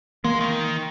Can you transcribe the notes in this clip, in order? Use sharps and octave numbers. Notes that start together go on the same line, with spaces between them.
E3 G#3 A#3
D#3